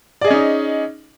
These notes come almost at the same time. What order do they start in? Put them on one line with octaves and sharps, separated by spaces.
D5 G#4 D#5 C#4 D#4